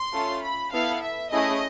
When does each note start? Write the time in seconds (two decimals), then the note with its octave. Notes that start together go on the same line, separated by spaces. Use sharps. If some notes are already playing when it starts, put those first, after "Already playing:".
Already playing: C6
0.13 A3 C#4 F4 A4
0.42 B5
0.72 B3 E4 A4 F5
1.02 E5
1.31 A3 C#4 E4 G#4 D#5